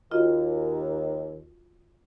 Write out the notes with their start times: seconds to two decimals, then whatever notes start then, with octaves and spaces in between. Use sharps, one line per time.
0.11 D#2 F4 F#4 D#5